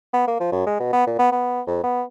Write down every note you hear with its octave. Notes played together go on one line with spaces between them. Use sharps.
B3
A#3
F3
F#2
G#3
B2
B3
A#2
B3
B3
F2
B3